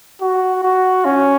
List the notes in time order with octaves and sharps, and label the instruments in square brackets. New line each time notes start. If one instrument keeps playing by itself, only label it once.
[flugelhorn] F#4
F#4
C#4